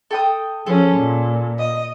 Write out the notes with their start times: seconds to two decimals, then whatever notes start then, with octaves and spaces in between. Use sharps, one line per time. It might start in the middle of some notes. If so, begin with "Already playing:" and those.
0.11 A4 G5 D#6
0.66 F3 C#4 G#4 A4
0.95 A#2
1.57 D#5